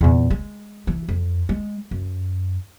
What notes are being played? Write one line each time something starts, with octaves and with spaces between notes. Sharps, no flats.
E2 A#2
G#3
E3
F2
G#3
F#2